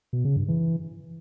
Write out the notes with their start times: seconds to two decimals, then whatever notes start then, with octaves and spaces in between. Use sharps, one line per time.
0.13 B2
0.25 C#3
0.36 G2
0.48 E3